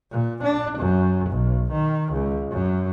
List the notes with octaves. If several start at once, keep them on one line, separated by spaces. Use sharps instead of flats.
A#2
D4
F#2
B1
D#3
C#2
F#2